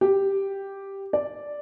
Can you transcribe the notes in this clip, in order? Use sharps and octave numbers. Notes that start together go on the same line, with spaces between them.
G4
D5